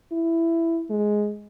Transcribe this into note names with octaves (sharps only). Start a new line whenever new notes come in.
E4
G#3